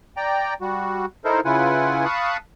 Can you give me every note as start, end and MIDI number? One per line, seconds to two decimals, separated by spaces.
0.17 0.54 74
0.17 0.54 79
0.17 0.54 82
0.61 1.05 55
0.61 1.05 66
1.25 1.40 63
1.25 1.40 64
1.25 1.40 69
1.25 1.40 70
1.25 1.40 72
1.45 2.05 49
1.45 2.05 64
1.45 2.05 65
1.45 2.05 71
1.45 2.05 78
1.45 2.05 80
2.05 2.37 77
2.05 2.37 81
2.05 2.37 83
2.05 2.37 85
2.05 2.37 87
2.05 2.37 90